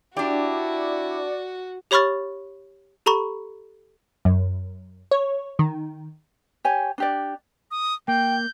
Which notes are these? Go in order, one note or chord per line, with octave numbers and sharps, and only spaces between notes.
D4 E4 F#4 G4 D5
G4 C#5 B5 C#6 F6 A6
G4 A4 A#5 B5 C#6
F#2
C#5
D#3
G4 C#5 G#5
D4 G4 D5
D#6
A#3 G5 G6